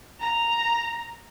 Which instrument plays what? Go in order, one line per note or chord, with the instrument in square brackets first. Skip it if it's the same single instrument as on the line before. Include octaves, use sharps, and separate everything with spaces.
[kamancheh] A#5